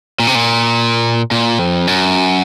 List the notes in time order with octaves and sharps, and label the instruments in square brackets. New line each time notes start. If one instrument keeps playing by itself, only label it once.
[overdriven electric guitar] A#2
C3
A#2
A#2
F2
F#2